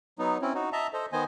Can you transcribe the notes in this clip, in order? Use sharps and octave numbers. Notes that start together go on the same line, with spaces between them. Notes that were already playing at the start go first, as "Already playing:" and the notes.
F#3 B3 D#4
C4 C#4 E4
D#4 F#4
D#5 E5 A5 A#5
A4 C5 D#5
D#3 B3 C5 D#5 G#5